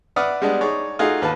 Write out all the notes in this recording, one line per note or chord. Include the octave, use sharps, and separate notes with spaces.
B4 D5 E5 F#5 D#6 F6
G3 G#3 B3 D4
D#4 G#4 C#5 D5
A3 D#4 F4 F#4 G#4
D#2 B4 F5 A5